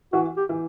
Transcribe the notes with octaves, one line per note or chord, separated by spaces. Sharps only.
E3 F#4
G4
E3